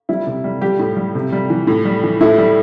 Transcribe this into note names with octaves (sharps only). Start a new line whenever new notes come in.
G3 E4
C3
G3
G3 G4
A2
G3
C3
G3
E3
A2
G3
E3
A2 E4 A4
G3